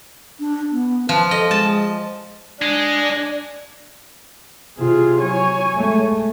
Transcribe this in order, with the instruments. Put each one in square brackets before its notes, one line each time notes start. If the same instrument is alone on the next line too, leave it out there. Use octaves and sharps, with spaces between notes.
[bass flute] D4
B3
[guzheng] F3 [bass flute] B4
[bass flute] A4 [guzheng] D#5
[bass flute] G#3 [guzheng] A5
[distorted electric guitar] G#3 [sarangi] D4
[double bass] C3 [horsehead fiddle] F4 G#4
[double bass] F#3 [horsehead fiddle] C#5 G#5
[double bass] G#3 A3